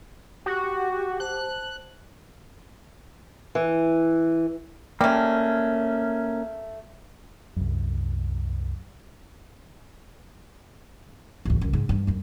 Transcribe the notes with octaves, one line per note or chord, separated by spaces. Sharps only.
F#4 G4
C5 A5 F#6
E3
G3 A3 A#3 C#4
C2 F#2
A1 D2
C#2 F#2
G#2
G2
F#2 D4